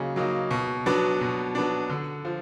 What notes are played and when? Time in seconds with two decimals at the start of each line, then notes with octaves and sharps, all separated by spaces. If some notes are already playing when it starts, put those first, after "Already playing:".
Already playing: C#3 F#3 A#3 D#4
0.16 F#3 A#3 D#4
0.51 B2
0.86 F#3 B3 D4
1.21 B2
1.55 F#3 B3 D4
1.90 D3
2.25 F3